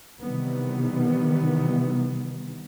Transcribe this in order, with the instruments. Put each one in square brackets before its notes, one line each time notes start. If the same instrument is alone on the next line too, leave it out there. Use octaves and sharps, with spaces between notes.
[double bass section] C3 D#3 E3 G3 B3